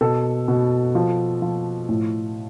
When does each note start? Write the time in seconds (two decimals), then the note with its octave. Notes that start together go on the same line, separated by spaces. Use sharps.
0.01 B2 A4
0.48 B2
0.95 F3
1.42 F3
1.89 A2